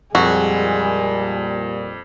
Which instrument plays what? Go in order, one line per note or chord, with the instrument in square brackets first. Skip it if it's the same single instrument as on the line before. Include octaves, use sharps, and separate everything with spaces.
[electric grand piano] F2 [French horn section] A#2 G3 [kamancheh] G#3 G#4 [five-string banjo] F#4